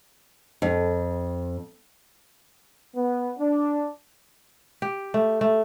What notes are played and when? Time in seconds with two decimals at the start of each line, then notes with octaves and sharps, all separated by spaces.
0.62 F2
2.95 B3
3.39 D4
4.82 G4
5.14 A3
5.41 A3